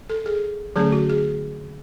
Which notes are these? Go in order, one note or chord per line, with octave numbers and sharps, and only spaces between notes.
A4
G#4
D3 F#3 A3 C#4 G#4
F#4
G#4